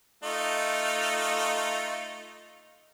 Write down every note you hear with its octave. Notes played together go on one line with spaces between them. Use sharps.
A3 D#4 F4